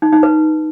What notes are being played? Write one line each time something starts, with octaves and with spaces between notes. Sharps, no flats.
D#4
D#4
B4